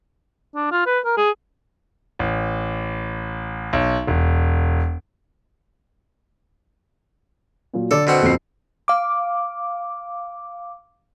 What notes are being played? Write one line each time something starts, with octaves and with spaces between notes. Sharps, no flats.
D4
F4
B4
A#4
G#4
A1
B1
E1
A#2 F#3
D3 A4 D5
B2 C4 F#5
D#1 F2 C7
F5 D6